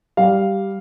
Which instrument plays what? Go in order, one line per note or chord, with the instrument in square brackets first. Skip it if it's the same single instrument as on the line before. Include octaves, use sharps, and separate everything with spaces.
[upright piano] G3 F5